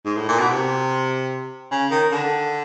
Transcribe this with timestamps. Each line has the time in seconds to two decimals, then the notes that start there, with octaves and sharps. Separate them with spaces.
0.05 G#2
0.17 A2
0.29 A#2
0.39 B2
0.50 C3
1.71 C#3
1.91 D#3
2.11 D3